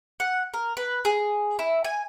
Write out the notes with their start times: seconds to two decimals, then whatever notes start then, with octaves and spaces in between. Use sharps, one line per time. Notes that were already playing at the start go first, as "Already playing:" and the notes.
0.20 F#5
0.54 A#4
0.77 B4
1.05 G#4
1.59 E4
1.84 G#5